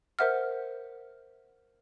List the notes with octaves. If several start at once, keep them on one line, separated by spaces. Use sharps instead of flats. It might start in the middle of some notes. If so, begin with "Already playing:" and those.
A#4 C5 E5 F#5 F6